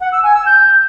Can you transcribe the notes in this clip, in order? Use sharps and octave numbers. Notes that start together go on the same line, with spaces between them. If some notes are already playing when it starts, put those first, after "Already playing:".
F#5
E6
G#5
E6
G6